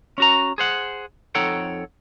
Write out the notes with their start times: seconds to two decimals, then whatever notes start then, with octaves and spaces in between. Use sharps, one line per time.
0.18 C#4 F#4 A#5
0.58 G#4 C5 F#5
1.35 F2 D#4 A4 C#5 F#5 G5